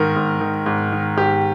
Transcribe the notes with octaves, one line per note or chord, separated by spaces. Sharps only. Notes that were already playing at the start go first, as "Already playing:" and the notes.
Already playing: G#2 D#3 A#4
G#2
D#3
G#2
D#3
G#2 G4